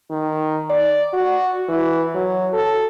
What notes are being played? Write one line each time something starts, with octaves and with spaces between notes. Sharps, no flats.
D#3
D5
F#4
E3
F#3
A4